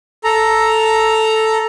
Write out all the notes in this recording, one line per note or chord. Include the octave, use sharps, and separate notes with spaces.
A4 A#5